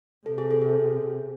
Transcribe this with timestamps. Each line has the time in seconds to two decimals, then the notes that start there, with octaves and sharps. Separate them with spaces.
0.26 C3 A4
0.38 G#4
0.51 A4
0.62 G#4